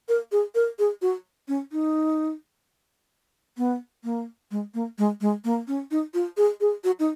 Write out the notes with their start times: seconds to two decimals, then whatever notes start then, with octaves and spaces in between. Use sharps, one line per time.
0.09 A#4
0.32 G#4
0.55 A#4
0.79 G#4
1.02 F#4
1.48 C#4
1.72 D#4
3.58 B3
4.04 A#3
4.51 G#3
4.74 A#3
4.98 G#3
5.21 G#3
5.44 A#3
5.68 C#4
5.91 D#4
6.14 F4
6.37 G#4
6.61 G#4
6.84 F#4
7.00 D#4